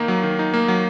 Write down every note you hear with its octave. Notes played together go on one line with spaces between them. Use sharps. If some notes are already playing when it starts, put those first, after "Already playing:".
Already playing: D#3 A#3 D#4
F#3
D#3
D#4
A#3
F#3